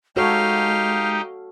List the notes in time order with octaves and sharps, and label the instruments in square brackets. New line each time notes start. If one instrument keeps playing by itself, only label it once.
[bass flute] G#3 [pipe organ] D#4 G4 [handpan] F#4 A4 C#5 [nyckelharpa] F5